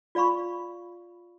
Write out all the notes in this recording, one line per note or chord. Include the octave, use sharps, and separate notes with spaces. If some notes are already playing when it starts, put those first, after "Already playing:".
F4 D5 F5 B5 C#6